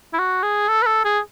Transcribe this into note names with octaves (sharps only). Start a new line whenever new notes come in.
E4
F#4
G#4
A4
B4
A4
G#4